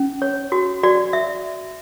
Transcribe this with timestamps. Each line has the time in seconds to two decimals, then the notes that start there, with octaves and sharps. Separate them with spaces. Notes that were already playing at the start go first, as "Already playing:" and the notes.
Already playing: C#4
0.22 C#5
0.52 F#4
0.83 F#4 D5
1.13 E5